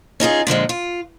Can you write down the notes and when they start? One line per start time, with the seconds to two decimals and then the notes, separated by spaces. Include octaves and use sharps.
0.20 C#4 D#4 F4 G#4
0.47 A#2 D3 F3 G#3
0.69 F4